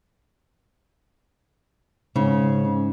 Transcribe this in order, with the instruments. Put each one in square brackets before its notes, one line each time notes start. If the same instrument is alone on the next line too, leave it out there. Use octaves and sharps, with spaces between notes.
[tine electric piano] G#2 [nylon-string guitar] C#3